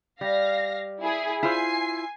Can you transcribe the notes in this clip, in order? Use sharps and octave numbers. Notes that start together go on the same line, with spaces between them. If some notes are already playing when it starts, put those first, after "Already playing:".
G3 F5 A#6
E4 G#4
E4 F4 C5 G#5 C7